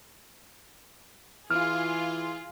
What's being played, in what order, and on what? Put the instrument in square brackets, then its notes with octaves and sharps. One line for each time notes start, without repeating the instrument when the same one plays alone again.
[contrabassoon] E3 [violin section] F4 G#4 [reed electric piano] F6